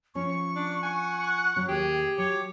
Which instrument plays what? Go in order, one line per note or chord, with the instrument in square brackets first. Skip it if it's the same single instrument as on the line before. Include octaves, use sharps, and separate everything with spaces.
[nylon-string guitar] F3 C#4 [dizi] C#6
[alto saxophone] D4
[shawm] F#5 [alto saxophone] G#5
[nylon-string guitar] F#3 C#4
[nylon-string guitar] D#2 [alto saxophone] G4 [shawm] G#4
[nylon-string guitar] F#3 [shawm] C#5 [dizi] D6